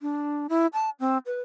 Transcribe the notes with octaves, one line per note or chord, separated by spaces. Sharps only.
D4
E4
A5
C4
B4